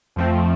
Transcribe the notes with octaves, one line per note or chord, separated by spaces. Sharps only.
F2 F3 A3 C4